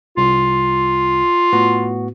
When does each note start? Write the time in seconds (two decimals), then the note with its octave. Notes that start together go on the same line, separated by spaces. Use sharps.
0.17 C2 F4
1.53 A2 B3 F#4